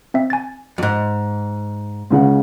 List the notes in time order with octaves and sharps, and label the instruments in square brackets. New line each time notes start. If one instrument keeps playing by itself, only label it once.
[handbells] C4 E5
G#5 A6
[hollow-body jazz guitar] F2 G#2
[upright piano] C#2 C#3 F#5